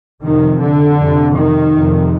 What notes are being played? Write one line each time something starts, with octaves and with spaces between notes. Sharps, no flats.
F2 C3 D#3
D3
F2 C3
D#3
F2 C3